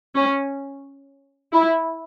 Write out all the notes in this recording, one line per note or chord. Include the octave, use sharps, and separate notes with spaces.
C#4
E4